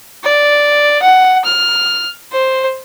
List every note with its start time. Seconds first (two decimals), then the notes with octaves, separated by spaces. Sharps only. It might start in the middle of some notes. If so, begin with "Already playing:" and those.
0.24 D5
1.02 F#5
1.45 F6
2.32 C5